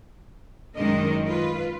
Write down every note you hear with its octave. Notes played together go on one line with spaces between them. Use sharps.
F#2 D#3 G#3 D4 A#4 D#5
F4 B4